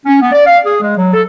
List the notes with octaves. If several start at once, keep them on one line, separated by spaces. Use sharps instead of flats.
C#4
B3
D5
F5
G#4
G#3
F#3
A4